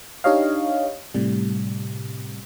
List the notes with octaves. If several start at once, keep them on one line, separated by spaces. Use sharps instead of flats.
D4 D#4 G4 C#5 D#5 F5
A2 C3 G3